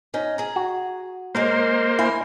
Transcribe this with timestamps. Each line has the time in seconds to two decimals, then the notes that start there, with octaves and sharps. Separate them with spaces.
0.14 C#4 D#4
0.38 G#4 A#5
0.56 F#4
1.35 G#3 A#3 C#4 A#4 C5
1.99 E4 G#5